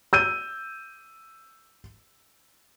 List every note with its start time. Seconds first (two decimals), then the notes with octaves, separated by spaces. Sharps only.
0.13 E6 G6 D#7